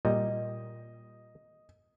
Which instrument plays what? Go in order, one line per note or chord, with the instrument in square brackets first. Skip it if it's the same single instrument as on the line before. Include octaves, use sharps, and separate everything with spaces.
[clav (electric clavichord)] A#2 G3 [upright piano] D#5